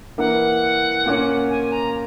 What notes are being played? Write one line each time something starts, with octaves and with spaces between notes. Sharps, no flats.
E3 A#3 E4 A#4 F#5
A#2 A#3 C#4
G#5
A#5